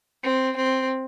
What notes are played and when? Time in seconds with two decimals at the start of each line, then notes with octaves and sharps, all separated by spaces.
0.24 C4
0.57 C4